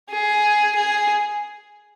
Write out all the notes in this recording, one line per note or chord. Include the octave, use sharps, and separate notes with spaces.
G#4
G#4